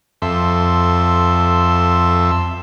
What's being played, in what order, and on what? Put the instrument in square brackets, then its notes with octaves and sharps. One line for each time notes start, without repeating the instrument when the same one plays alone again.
[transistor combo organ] F2 A4 E5 C6